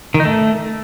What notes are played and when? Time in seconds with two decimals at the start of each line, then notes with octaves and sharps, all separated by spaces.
0.14 D#3
0.20 D#4
0.25 A3